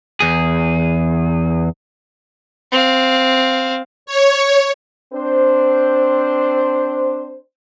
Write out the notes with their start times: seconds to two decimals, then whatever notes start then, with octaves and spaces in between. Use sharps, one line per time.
0.20 E2 G#4
2.72 C4 F5
4.06 C#5
5.14 C4 D4 C5